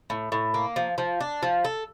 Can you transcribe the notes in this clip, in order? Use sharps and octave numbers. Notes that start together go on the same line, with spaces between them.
A2
A2
A#3
F3
F3
D4
F3
A4